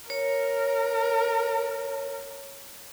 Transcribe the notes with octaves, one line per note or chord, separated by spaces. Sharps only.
A#4 C#5